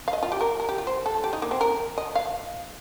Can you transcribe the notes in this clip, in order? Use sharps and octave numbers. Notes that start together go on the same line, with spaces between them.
F5
D#5
F4
G4
A#4
A#4
G4
F4
C5
A4
G4
D#4
A#3
C4
A#4
D#5
F5